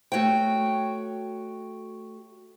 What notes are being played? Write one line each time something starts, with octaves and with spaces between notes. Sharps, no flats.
A3 F#4 C#5 G5